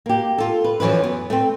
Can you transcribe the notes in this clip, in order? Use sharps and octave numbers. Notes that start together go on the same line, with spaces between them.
A#3 G4
F4 A4
B4
F#2 E3 F3 B4
B3
A3 C4